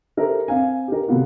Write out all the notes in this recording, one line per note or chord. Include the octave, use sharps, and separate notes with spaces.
G4 A4 A#4 C5 E5
C4 F5 G#5
G4 A#4
C3 A3 B3 F4 F#4